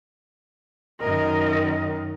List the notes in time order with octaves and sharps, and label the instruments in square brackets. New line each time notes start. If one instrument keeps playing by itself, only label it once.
[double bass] F#2 D#3 [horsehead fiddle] A#4 D#5